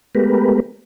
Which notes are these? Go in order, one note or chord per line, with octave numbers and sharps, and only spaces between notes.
G#3 A3 B3 G4 A#4 B4